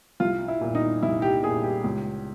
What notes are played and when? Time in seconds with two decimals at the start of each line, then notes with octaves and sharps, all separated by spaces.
0.20 C2 F4
0.48 E4
0.61 A#2
0.75 D#4
1.03 C2 E4
1.22 G4
1.43 A#2 G#4
1.63 G4
1.84 C#2